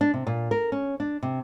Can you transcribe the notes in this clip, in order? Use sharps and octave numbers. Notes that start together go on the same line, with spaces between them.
D4
C3
A#2
A#4
C#4
D4
C3